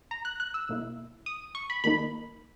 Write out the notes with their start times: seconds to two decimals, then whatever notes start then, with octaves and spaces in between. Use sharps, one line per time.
0.11 A#5
0.25 F#6
0.40 F#6
0.54 E6
0.69 B2 A#3 E4
1.26 D#6
1.55 C#6
1.70 B5
1.84 D#2 D#3 A#3 D#4 B5